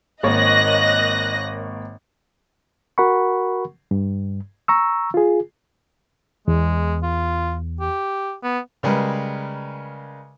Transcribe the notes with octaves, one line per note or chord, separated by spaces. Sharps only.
G#1 A#3 C#5 D#5 F#6 A#6
F#4 A#4 F#5 B5 C#6
G2
A#5 C#6 E6
F4 G#4
E2 G#3
F4
G4
B3
C#3 G3 G#3 A#4 B4